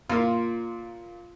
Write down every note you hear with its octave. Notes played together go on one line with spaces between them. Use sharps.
A#2 A#3 F4